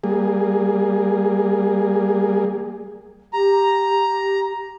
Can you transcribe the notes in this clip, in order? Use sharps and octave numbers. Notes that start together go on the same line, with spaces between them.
G3 A#3 G#4
G4 A#5